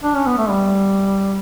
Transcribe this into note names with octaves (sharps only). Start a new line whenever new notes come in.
D4
C#4
B3
A3
G3